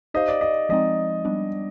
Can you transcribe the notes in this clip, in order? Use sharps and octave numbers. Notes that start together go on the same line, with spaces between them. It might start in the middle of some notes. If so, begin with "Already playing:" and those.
D#4 G4 C5 D#5 F5
D5
D#5
F3 G#3 C4 D#4 D#5
G3 B3 D4